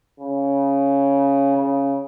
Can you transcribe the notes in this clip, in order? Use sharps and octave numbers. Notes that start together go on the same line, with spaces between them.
C#3
C#3